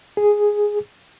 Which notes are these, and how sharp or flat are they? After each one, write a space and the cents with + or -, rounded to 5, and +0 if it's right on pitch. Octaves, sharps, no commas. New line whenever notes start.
G#4 +0